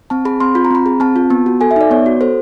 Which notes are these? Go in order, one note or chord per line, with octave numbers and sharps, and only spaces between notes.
C4 A5
G#4 B5
C4 C6
F4 B5
A#5
C4 B5
G#4
C4 A5
F4
B3
F#4
A4 G#5
E5
D#4 D5
B3 C#5
F#4
A4 C5